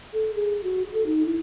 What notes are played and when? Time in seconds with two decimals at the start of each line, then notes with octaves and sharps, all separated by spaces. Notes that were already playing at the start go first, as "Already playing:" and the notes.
0.13 A4
0.36 G#4
0.64 F#4
0.93 A4
1.06 D#4
1.26 E4